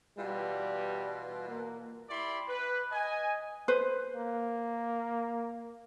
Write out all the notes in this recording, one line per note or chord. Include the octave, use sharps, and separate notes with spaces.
B2 E3 G3 F4
A#3
E4 G4 D5 B5 C6
B4
D#5 G#5
B4 C5
A#3